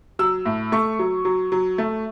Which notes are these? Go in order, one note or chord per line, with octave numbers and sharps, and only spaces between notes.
F#3 E6
A2
A3 C#6
F#3
F#3
F#3
A3